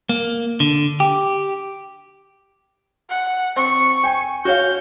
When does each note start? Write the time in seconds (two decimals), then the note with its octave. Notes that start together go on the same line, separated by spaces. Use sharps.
0.09 A#3
0.60 D3
1.00 G4
3.10 F#5
3.56 C4 C#6
4.04 G5 G#5
4.45 F#4 C#5 F5 G6